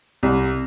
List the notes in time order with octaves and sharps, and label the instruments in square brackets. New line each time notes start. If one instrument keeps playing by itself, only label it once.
[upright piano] C2